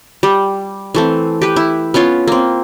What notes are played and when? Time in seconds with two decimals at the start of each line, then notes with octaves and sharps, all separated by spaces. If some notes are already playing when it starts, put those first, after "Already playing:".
0.23 G3
0.95 E3 A3 C4
1.42 G4 B4
1.56 E4
1.94 B3 C#4 F4 C#5
2.27 A#3 C4